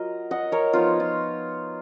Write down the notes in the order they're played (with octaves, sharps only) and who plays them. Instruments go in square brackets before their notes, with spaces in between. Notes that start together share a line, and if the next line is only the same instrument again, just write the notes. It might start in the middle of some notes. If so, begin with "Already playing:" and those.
Already playing: [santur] F#3 F4 A#4 D#5
D#5 F#5
A#4 C#5
F3 B3 D#4 F4
F4